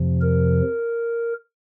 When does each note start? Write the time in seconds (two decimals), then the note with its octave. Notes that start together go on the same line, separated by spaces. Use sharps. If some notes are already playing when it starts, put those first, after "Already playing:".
Already playing: F2 C3 F3
0.21 A#4